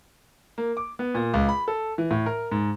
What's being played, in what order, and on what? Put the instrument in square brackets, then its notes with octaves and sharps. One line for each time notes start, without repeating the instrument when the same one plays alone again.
[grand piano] A#3
D6
B3
A#2
C#2
B5
A4
E3
A2
A#4
G#2